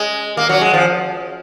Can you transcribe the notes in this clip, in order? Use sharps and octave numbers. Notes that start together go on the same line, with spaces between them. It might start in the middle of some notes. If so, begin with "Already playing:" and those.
Already playing: G#3
A#3
F#3
G#3
F3